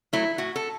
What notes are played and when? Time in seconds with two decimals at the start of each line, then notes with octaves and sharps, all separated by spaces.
0.13 F#3 A3 E4
0.38 A2 F#4
0.56 A4